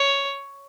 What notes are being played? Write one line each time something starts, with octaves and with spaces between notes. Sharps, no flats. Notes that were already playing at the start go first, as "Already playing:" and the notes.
Already playing: C#5